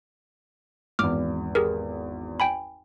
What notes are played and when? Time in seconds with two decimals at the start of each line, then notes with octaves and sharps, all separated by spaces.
0.99 G#1 E2 D6 F6
1.55 G4 G#4 A#4
2.40 G5 G#5 B5